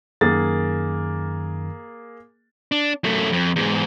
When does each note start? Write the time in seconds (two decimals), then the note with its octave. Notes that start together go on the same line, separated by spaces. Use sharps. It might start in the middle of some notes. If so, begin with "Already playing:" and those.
0.21 F#2 D#3 A#3 G#4 A6
2.72 D4
3.04 F#2 A3
3.32 F2
3.56 E2 G#2